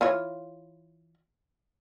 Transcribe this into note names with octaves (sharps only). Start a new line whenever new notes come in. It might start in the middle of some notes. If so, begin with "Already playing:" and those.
E3 F4 C#5